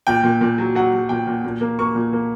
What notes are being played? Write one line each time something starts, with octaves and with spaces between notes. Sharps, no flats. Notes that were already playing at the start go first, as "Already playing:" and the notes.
A#2 G5
A#2
A#2
F#3
F#3 F#5
F#3
A#2 G5
A#2
A#2
A#3
A#3 C#6
A#2
A#3